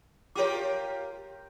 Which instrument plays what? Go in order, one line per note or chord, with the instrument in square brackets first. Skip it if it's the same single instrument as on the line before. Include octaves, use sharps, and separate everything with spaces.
[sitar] F4 G4 A#4 [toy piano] C#5 G5 D6